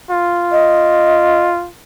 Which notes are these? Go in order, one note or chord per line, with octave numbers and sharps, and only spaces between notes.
F4
D#5